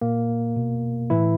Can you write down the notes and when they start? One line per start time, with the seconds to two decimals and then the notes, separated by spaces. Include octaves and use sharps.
0.02 A#2 A#3
0.56 B2
1.10 A2 E3 E4